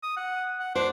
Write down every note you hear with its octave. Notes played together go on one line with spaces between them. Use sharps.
D#6
F#5
F#5
D4 C5